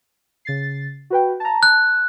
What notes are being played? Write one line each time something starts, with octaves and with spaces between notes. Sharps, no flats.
C#3 A6 C7
F#4 B4 G5
A5 A#5
A5 F#6